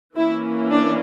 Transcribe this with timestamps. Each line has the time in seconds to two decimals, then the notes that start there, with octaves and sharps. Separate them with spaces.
0.16 E3 A#3 C#4 E4
0.71 D4